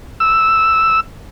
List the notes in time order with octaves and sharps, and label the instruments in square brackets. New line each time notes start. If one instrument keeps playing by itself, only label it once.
[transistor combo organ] E6